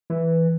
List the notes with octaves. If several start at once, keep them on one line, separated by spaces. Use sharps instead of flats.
E3